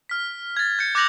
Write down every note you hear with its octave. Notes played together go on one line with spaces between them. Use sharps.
F6 B6
G#6 A6
G6 C#7
D6 F#6 G6 A#6 F7 F#7